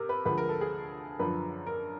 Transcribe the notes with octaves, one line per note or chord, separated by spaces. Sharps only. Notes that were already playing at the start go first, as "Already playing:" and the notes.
Already playing: C3 A#4
B4
D2 D3 F3 G#3 B4
A#4
A4
G#4
F#2 D3 F3 B4
A#4